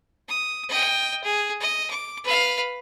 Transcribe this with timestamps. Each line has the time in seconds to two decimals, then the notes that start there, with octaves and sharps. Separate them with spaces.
0.28 D#6
0.69 D#5 G5
1.24 G#4
1.61 D#5
1.90 D6
2.24 B4 F5